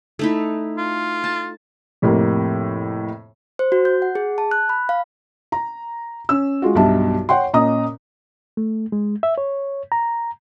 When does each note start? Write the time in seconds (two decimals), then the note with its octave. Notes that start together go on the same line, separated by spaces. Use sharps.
0.19 A3 D#4 E4
0.77 F4
1.24 A5
2.02 F2 A2 C3 A#3
3.59 C5
3.72 F#4
3.85 G6
4.02 F#5
4.15 G#4
4.38 A5
4.51 F#6
4.69 B5
4.89 F5
5.52 A#5
6.29 C#4 E6
6.62 G#3 F4 F#4
6.75 B1 G2 E5 A5
7.29 C#5 F#5 G5 C6
7.53 A#2 C#4 D#5 A#5 D#6
8.57 A3
8.92 G#3
9.23 E5
9.38 C#5
9.92 A#5